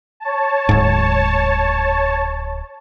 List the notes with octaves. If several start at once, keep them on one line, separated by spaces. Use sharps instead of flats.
C#5 A5
D1 G#2